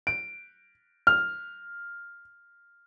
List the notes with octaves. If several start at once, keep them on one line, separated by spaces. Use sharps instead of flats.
D7
F6